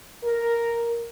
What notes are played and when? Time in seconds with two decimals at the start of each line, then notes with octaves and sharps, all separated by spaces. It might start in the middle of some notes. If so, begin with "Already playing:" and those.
0.24 A#4